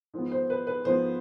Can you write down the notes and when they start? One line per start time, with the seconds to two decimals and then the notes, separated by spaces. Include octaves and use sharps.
0.14 G#2 F3 B3
0.32 C5
0.50 B4
0.67 B4
0.85 G#2 F3 B3 C5